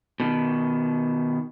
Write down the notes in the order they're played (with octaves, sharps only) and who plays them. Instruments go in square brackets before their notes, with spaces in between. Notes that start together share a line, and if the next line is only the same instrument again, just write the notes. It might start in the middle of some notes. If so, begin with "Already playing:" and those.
[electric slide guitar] B2 D#3